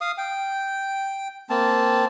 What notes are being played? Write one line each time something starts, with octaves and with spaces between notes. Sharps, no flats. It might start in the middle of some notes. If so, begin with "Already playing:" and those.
F5 D#6
G5
A#3 C4 A5